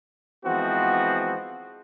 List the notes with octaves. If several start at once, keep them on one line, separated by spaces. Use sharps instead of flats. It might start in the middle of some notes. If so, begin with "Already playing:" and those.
E3 F3 G#3 B3 C4 F#4